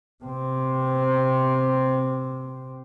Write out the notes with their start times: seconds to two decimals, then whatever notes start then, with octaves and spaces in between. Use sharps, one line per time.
0.24 C3 C4